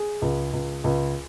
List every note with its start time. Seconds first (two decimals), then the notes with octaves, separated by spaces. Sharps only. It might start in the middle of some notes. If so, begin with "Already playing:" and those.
Already playing: G#4
0.22 C#2
0.53 C#2
0.84 C#2